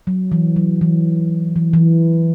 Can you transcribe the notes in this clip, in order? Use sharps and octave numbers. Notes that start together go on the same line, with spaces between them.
F#3
E3
F#3
E3
E3
E3